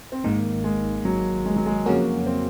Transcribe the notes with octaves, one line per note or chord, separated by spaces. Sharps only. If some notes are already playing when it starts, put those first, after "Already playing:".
C4
G#1 G#2 D#3 A#3
G#3
F#3
G#3
F#3
G#3
F2 C#3 F#3 A#3 C#4 F#4
C4